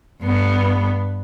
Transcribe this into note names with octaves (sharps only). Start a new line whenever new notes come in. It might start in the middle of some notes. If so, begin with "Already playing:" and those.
G2 B3